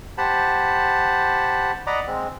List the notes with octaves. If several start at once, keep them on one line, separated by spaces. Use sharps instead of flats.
G4 C5 F#5 A5 B5
D5 D#5 F#5 A#5 B5 D6
G#3 C4